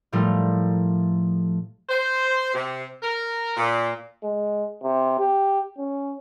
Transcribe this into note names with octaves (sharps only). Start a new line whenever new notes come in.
A2 F3 G3 A3 A#4
C5
C3
A#4
A#2
G#3
C3
G4
C#4